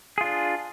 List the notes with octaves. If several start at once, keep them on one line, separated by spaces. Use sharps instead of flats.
D4 F4 G#4